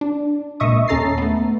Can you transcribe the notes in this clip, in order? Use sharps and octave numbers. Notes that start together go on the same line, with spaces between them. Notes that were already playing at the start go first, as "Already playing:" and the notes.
D4
C#2 A#2 D#5 E5 C#6 D#6
D#2 C#4 A4 A#5 A6 C7
A3 B3